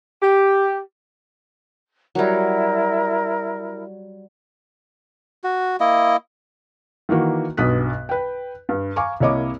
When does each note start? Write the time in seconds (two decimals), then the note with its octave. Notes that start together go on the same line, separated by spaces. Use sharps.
0.22 G4
2.15 F#3 G3 E4 A#4
5.44 F#4
5.80 A#3 E4 D#5
7.09 D#3 E3 A#3 F#4
7.57 B1 G2 B2 D#6 F#6 B6
8.09 B4 G5
8.69 G2
8.96 F5 G#5 A#5 C#6 D6
9.20 C2 A#3 E4 C#5 D#5 D6